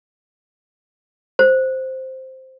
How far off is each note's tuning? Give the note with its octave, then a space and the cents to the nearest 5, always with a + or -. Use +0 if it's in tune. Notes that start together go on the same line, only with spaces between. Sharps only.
C5 +0